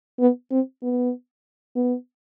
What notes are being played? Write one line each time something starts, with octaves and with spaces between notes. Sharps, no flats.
B3
C4
B3
B3